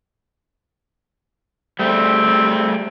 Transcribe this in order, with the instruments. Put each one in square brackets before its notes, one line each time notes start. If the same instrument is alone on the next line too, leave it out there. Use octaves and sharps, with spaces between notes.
[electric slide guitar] G3 A3 [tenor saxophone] C4